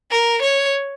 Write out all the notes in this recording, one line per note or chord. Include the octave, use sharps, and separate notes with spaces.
A#4
C#5